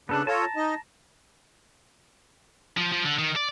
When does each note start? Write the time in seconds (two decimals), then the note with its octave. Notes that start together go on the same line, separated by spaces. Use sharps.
0.09 C#3 B3 D4 A4 B4
0.27 F4 A4 C#5 A5 A#5
0.56 D#4 D#5
2.77 F3
2.92 F3
3.05 D3
3.19 D#3
3.36 D5